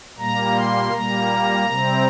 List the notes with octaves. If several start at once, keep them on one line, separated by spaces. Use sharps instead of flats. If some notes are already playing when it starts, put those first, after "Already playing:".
A#2 G3 A#3 A#5
C6
A#2 G3 A#3 A#5
C3 G3 C4